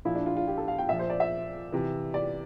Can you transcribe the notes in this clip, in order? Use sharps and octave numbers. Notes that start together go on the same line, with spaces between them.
A#2 F3 E4
D4
F4
F4
G4
A4
F5
G5
A#2 F3 E5
C5
D5
E5
C3 E3
D5